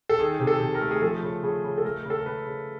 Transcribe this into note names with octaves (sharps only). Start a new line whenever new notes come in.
A4
D#3 G#4
C3
A4
C3
A#4
A3
G#4
F3 A4
C#3
C#3 G#4
C#3
A4
A3 A#4
C#3 A4
A#4
C#3 B4
C#3